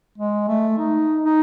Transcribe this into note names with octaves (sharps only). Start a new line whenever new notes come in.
G#3
A3
D#4
D#4